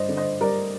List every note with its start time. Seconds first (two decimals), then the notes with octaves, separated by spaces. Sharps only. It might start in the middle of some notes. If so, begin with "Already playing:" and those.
Already playing: G2 C5 D5 D#5
0.09 D3
0.17 C5 D#5
0.40 G3 A#4 D5